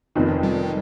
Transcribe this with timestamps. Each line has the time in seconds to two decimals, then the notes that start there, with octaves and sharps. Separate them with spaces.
0.15 F1 F2 D#3
0.43 G3